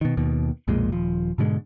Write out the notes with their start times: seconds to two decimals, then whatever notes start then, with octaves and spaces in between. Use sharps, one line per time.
0.01 B2 D#3
0.17 D#2 B2 D#3
0.68 B1 F2 A#2 G#3
0.92 D#1 F3
1.38 G#2 B2 D3 G#3